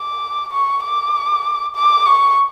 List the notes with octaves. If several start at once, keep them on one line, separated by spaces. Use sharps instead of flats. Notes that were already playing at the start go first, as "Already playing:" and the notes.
Already playing: D6
C#6
D6
D6
C#6